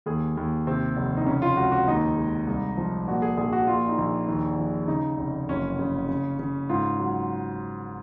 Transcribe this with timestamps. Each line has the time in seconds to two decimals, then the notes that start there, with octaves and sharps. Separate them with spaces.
0.06 D#2 G#4
0.37 D#2
0.67 C3 C4
0.96 F1
1.17 D#4
1.26 C#3 C#4
1.42 F4
1.57 C#2 F#4
1.72 F#4
1.88 D#2 D#4
2.17 G#3
2.47 C2
2.77 F3
3.08 A#2 F#4
3.22 G#4
3.37 A#1 G#4
3.53 F#4
3.67 A#2 F4
3.88 D#4
3.98 A#1
4.27 D#2 D#4
4.58 F3
4.88 C#3 D#4
5.18 F1
5.48 F#1 C#4
5.79 C#3
6.09 C#3
6.39 C#3
6.69 G#2 F4
7.00 F#3